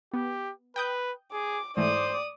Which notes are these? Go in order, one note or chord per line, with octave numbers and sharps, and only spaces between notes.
B3 G4
B4 G5 D#6 G6
G#4 D6
G#2 E3 A3 C5 D5 D#6